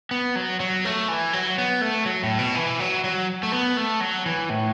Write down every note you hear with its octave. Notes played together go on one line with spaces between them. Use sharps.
B3
F#3
F#3
A3
E3
F#3
B3
A3
F#3
A2
B2
E3
F#3
F#3
A3
B3
A3
F#3
E3
A2